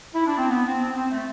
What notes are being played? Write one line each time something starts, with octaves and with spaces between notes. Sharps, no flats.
E4
D4
C4
B3
C4
C4
C4
A3